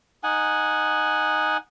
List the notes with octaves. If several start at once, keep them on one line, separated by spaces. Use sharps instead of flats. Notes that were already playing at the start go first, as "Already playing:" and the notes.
D#4 F#5 G#5